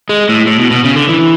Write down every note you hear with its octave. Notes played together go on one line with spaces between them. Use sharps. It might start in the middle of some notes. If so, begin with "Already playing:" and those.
G#3
A2
A2
B2
B2
C#3
D3
E3